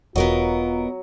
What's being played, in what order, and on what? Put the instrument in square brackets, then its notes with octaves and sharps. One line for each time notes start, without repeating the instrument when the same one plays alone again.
[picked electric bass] E1 [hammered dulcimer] F#3 [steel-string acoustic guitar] B3 A#4 D#5 [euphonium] F4